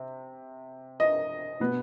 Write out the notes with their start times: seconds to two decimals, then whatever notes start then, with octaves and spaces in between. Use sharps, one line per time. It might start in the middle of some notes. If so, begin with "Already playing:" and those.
Already playing: C3
1.00 D#5
1.60 B2 B3